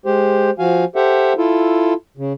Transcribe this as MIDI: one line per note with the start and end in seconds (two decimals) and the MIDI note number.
0.06 0.50 56
0.06 0.50 67
0.06 0.50 72
0.59 0.85 53
0.59 0.85 66
0.59 0.85 77
0.59 0.85 80
0.96 1.33 67
0.96 1.33 69
0.96 1.33 72
0.96 1.33 76
0.96 1.33 78
1.37 1.94 64
1.37 1.94 65
1.37 1.94 69
2.17 2.33 49